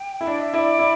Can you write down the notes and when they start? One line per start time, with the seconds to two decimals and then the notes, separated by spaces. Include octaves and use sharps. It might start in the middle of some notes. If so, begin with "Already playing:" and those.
Already playing: G5
0.21 E4
0.27 D4 D5
0.40 E5
0.53 E4 D5
0.79 E4